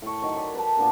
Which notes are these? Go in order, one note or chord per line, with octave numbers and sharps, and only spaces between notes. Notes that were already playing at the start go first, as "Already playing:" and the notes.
A2 C#6
D#3 F#3 C#5
D5 B5 C6
B4 G5 A5
A#2 B3 D4 A#4